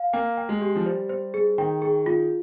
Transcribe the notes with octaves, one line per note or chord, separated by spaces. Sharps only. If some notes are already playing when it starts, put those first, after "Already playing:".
Already playing: F5
A#3 G5
G5
G#3
G4
F3
G3 C5
C5
G#4
D#3 G5
G#4
F4